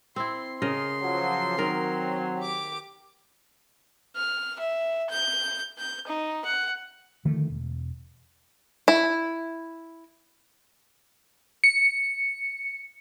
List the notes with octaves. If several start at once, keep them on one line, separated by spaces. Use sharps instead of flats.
C4 E4 C6
C#3 A#4 D#5 C6
F3 F#3
D#3 F#3 C4 A#4
G4 D6
F6
E5
G6
G6
D#4
F#5
D3 D#3 F3 A3
E1
E4
C#7